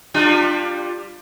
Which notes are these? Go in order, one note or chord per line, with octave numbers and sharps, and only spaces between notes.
G3 D4 F4